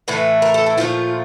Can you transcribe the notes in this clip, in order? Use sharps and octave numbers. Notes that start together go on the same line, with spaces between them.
A2 E3 A3 B4
A#4
A4
E4
A#2 F3 A3 F4